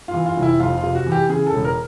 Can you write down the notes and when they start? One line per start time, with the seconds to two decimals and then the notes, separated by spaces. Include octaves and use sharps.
0.08 F4
0.14 E3
0.26 F4
0.37 F1
0.43 E4
0.60 F2 F4
0.78 F4
0.83 C3
0.95 F#4
1.06 E3
1.12 G4
1.29 C#3 G#4
1.47 A4
1.53 E1
1.64 A#4